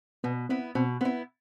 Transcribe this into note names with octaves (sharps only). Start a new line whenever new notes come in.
B2 B3
B3 C4 E4
B2 C4
B3 C4 E4